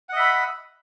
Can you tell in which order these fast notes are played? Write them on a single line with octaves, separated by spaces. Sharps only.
F#5 D#5 E5 B5